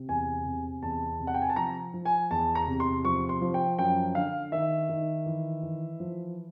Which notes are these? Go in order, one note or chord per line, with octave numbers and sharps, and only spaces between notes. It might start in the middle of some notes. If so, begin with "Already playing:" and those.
Already playing: C3
E2 G#5
C3
E2 A5
C3
F#5
G5
G#5
A5
F3 A#5
F3
G#5
E2 A5
A#5
C3
C6
F3 C#6
C6
F3
G5
F#2 G5
D3 F5
D#3 E5
D#3
E3
E3
F3